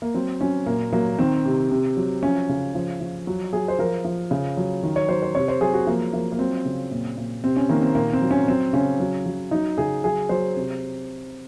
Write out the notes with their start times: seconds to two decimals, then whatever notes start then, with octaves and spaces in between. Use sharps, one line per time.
0.02 A#3
0.14 F#3 C4
0.41 F#3 C#4
0.66 A#2 A#3
0.93 F#3 A#3
1.19 D#3 C4
1.45 C3
1.71 C3
1.97 F#3
2.22 F3 C#4
2.49 C#3
2.74 F3
3.00 F3
3.27 F#3
3.53 F#3 G#4
3.68 C5
3.79 F3 A#4
4.05 F3
4.31 C#3
4.57 F#3
4.83 D#3
4.96 C#5
5.09 F#3 C5
5.22 C5
5.35 C3 C#5
5.48 C5
5.61 F#3 G#4
5.74 F#4
5.87 F3 A#3
6.13 F3 A#3
6.32 A#3
6.39 F#3 C4
6.65 C#3
6.91 A#2
7.17 A#2
7.44 C3 C4
7.57 C#4
7.69 D#3 A#3
7.82 C4
7.95 A#2 A#3
8.13 C4
8.22 F#3
8.31 C#4
8.48 F#3 C4
8.73 C#3 C#4
9.00 F#3
9.26 F#3
9.51 F#3 D#4
9.78 C#3 G#4
10.04 F#3 G#4
10.29 F#3 C5
10.56 C3